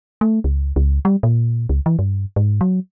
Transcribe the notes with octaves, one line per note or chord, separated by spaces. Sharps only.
A3
C#2
C#2
G3
A#2
C#2
E3
G2
G#2
F#3